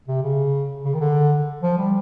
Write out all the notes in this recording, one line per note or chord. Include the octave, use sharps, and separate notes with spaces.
C3
C#3
C#3
D#3
D3
F3
G3